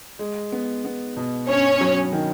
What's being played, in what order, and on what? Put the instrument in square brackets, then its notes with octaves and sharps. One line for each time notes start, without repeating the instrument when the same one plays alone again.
[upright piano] G#3
B3
B3
B2
[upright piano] G2 [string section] C#4 C#5
[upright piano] F#3
D#3